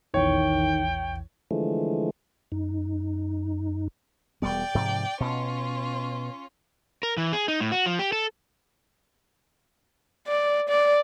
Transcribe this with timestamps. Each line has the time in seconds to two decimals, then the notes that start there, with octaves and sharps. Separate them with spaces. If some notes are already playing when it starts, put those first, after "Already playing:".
0.14 A#1 E2 D#3 E3 C#5 G5
1.51 D3 E3 F3 G#3 A3
2.52 F#2 D#4
4.42 E1 G3 B3 D5 G5
4.75 G#2 C3 F3
5.20 B2 C#4 F4
7.03 A#4
7.17 E3
7.33 G#4
7.48 D#4
7.61 A2
7.72 F#4
7.86 F3
7.99 G4
8.12 A4
10.27 D5
10.69 D5